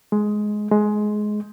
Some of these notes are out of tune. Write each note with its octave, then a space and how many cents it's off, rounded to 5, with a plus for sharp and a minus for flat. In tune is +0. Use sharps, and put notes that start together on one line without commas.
G#3 +10
G#3 +15